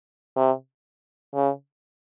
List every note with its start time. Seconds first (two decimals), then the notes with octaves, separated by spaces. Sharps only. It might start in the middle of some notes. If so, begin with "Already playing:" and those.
0.36 C3
1.34 C#3